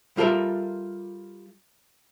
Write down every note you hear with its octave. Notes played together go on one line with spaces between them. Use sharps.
G3 F4 A4 A#4 E5